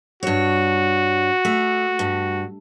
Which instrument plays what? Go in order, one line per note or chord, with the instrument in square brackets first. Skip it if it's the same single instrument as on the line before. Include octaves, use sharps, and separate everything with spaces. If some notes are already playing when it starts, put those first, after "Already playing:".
[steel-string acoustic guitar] G2 C#5 [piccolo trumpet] F#4
[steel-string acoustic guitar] A3
G2